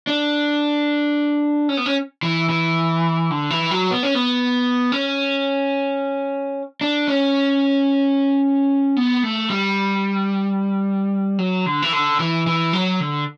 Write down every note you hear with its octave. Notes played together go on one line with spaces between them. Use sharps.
D4
C#4
B3
C#4
E3
E3
D3
E3
F#3
B3
C#4
B3
C#4
D4
C#4
B3
A3
G3
F#3
D3
E3
D3
E3
E3
F#3
D3